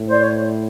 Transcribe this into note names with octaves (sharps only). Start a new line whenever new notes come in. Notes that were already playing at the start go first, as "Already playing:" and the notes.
Already playing: A2
C5 D5
C#5